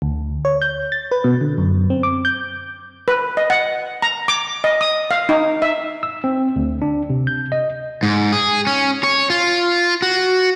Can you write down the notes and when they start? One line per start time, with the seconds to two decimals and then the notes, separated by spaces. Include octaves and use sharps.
0.02 D2
0.45 C#5
0.62 G6
0.92 A6
1.11 B4
1.24 B2
1.41 D3
1.58 F#2
1.90 C4
2.03 D6
2.25 G6
3.08 B4
3.37 D#5
3.50 F#5
4.02 A#5
4.28 D6
4.64 D#5
4.81 D#6
5.11 F5
5.29 D#4
5.62 E5
6.03 E6
6.24 C4
6.56 D2
6.82 D4
7.10 C3
7.27 G6
7.52 D#5
8.03 G#2
8.32 G#4
8.67 C#4
9.04 C#5
9.30 F4
10.02 F#4